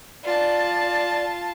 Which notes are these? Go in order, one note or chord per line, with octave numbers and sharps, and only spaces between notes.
F4 D5 A5